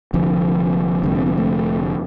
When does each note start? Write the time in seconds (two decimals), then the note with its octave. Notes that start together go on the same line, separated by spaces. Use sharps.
0.13 F1 F2 D3 F3
1.03 F1 F2 D3 G3
1.15 C4
1.26 B3
1.38 A3